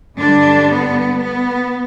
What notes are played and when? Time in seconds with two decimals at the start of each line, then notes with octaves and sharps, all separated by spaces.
0.20 G2 D3 G3 D4
0.72 B3
1.23 B3